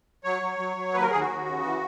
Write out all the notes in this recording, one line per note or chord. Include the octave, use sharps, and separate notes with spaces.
F#3 C#5
F#3
F#3
F#3
D#2 B4
A#4
D#2 G#4
F#4
D#2
C#3
E3